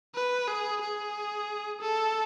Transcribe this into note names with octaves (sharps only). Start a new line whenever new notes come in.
B4
G#4
G#4
A4